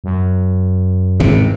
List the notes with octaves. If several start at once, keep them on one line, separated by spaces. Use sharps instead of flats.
F#2
G#1 E2 C3